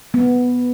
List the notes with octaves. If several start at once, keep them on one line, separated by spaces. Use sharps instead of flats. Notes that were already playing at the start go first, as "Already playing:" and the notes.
B3